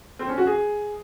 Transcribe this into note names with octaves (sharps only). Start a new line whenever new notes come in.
C4
C#4
F#4
G#4